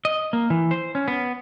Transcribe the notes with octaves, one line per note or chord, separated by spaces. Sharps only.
D#5
A#3
E3
C5
C#4
B3